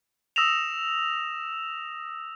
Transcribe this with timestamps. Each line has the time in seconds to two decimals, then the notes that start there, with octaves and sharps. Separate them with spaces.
0.36 D#6 E6 A#6 E7 F7